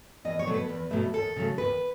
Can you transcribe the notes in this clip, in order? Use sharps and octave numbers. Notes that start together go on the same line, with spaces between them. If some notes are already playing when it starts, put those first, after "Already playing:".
E2 D#5
C#5
B2 F#3 A3
B4
E2
B2 F#3 A3
D#2 A4
C#3 F#3 A3
D#2 B4